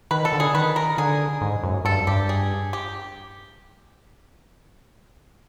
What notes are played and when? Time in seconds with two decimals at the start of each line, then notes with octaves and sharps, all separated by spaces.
0.11 D#3 B4
0.25 A4
0.33 D3
0.40 G#4
0.54 D#3 B4
0.76 A#4
0.98 D3 G#4
1.41 G#2
1.63 F#2
1.85 G2 A4
2.07 G2 G4
2.29 G#4
2.73 G4